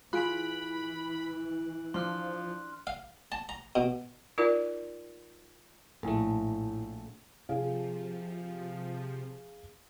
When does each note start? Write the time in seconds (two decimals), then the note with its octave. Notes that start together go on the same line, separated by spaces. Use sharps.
0.13 E3 F4 G#4 B5 F#6 D7 F#7
1.94 F3 D4 C6 F6 F#6
2.87 F5
3.32 A5
3.49 A#5
3.76 B2
4.38 D#4 F4 A#4 D5
6.03 A#1 A2 A3
7.49 C3 F3 G#4 F5